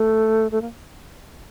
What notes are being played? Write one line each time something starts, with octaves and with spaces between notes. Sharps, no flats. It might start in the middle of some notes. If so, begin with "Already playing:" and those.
Already playing: A3
A3
A#3